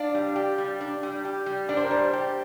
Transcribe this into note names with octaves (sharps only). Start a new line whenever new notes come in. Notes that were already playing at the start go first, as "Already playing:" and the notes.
Already playing: D4 D5 F5
G3
G4
G3
D4
G3
G4
G3
D4 D5
C5
A#4
G3 C5
G4